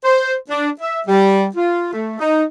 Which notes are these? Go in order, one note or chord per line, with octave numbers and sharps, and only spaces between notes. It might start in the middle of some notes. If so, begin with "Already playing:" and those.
C5
D4
E5
G3
F4
A3
D#4